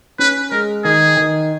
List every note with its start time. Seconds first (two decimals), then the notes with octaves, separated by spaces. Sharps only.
0.19 C#4 B4
0.51 G#3 A#4
0.84 D#3 G#4
1.17 D#3